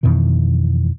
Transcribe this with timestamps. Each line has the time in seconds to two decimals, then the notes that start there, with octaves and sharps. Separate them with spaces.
0.03 F2 B2 D#3 E3